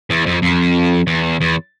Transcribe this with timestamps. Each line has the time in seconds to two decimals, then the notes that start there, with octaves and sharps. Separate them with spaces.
0.10 E2
0.26 F2
0.42 F2
1.07 E2
1.41 E2